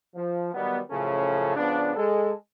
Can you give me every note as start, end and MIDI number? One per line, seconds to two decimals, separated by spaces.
0.15 0.50 53
0.54 0.79 51
0.54 0.79 54
0.54 0.79 55
0.54 0.79 59
0.91 1.55 42
0.91 1.55 45
0.91 1.55 49
0.91 1.55 53
0.91 1.55 61
0.91 1.55 69
1.57 1.94 49
1.57 1.94 53
1.57 1.94 59
1.57 1.94 62
1.96 2.31 56
1.96 2.31 69